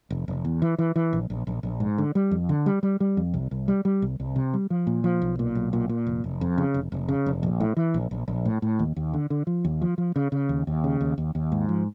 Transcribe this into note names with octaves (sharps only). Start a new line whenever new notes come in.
F1
F1
E2
E3
E3
E3
A#1
A#1
A#1
A#1
G#2
D3
G3
F2
D3
G3
G3
G3
F2
C2
C2
G3
G3
C2
C2
C3
G3
F3
A#2
F3
B1
A#2
B1
A#2
A#2
F1
F1
F2
C#3
F1
F1
C#3
F1
A#1
A2
E3
A#1
A#1
A#1
A2
A2
D#2
D#2
D3
D3
F3
D#2
F3
F3
C#3
C#3
D#2
D#2
C#3
D#2
D#2
D#2
G#2
F3